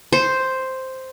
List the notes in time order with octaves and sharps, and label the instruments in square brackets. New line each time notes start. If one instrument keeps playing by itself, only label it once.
[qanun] C5